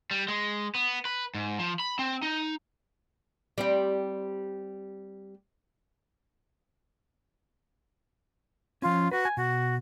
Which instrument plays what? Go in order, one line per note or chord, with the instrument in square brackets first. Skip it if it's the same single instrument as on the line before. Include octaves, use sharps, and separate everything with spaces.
[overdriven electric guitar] G3
G#3
B3
B4
G#2
F3
B5
C4
D#4
[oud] G3 C4 G4
[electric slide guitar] F3 C#4 [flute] F4
[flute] F#4 [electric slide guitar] B4
[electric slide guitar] G#5
[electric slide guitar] B2 [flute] F#4